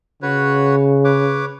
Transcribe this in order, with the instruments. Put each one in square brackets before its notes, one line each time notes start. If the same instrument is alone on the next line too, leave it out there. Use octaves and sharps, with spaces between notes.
[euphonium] C#3 [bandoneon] F#4 B4 C#5
[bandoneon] B4 C#5 D6